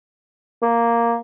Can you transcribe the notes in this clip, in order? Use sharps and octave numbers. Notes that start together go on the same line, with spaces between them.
A#3